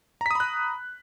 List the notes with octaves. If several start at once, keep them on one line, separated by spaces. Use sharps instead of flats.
A#5 B5 D#6 F#6 B6